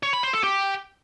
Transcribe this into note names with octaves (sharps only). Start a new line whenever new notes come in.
C#5
B5
C5
A4
G4